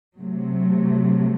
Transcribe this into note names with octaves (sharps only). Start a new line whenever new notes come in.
C3 F#3 A3